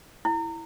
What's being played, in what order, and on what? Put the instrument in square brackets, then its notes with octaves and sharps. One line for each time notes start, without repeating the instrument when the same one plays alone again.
[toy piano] E4